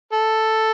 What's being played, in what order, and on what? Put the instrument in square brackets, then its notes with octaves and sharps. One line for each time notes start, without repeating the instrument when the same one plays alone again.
[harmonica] A4